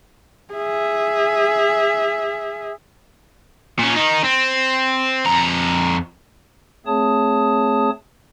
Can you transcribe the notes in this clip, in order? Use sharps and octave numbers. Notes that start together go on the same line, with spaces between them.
G#4 E5
A#2 C#4
D#3 D#4
C4
F2 A#5
A3 C4 G#4 C#5 A5 D#6